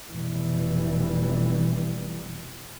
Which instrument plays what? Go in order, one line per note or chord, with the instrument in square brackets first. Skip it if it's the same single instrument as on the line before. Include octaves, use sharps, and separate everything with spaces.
[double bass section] F1 B2 E3 G3